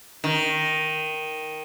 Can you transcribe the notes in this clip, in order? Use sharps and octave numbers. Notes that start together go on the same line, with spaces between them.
D#3